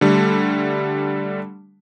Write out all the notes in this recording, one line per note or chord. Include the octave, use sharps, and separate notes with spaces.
D3 G3 A3